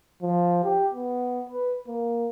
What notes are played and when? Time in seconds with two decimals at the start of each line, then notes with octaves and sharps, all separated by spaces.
0.22 F3
0.64 G4
0.94 B3
1.49 B4
1.88 A#3